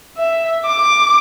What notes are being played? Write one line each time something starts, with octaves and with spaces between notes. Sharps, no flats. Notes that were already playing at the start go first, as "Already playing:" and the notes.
E5
D6